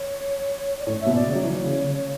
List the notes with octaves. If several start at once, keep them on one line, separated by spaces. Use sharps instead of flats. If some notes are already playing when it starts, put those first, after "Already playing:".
Already playing: C#5
D5
A2 C#5
E5
B2
D5
C#3
F#3 C#5
E3
C#3
C#3